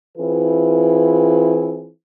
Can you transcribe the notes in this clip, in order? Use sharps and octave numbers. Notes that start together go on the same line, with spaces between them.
E3 C4 E4 F4 G#4 B4